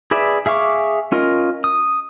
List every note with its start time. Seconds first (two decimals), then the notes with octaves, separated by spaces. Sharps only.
0.11 G#4 B4 D5 E5
0.46 G#4 E5 F5 C#6 D6
1.12 C#4 F4 A#4 D#5
1.64 D#6